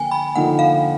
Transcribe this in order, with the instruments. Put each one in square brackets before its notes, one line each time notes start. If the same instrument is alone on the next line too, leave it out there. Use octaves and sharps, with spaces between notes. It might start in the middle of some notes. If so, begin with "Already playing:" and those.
Already playing: [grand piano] D3 F3 A#3 [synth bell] G5 G#5
[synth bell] B5
[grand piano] D3 F3 A#3 D#4 [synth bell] F#5
[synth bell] F5